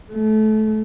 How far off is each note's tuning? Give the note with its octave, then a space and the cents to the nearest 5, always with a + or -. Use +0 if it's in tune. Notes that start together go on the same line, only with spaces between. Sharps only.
A3 -25